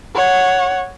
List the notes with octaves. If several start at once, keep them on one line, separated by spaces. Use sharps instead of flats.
C#5 F#5